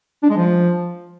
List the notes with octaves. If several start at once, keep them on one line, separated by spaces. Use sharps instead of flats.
D4
G#3
F3